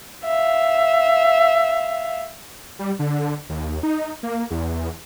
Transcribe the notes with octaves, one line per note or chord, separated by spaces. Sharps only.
E5 F5
G3
D3
D#2
D#4
A#3
E2